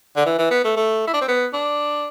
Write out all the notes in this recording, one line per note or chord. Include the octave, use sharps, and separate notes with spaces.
D3
E3
E3
B3
A3
A3
E4
D4
C4
B3
D4